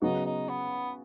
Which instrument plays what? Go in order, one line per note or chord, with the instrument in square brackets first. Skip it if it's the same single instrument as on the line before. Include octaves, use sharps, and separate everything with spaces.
[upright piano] C#3 F#3 B3 F#4 [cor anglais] D#4
[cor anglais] D#4
B3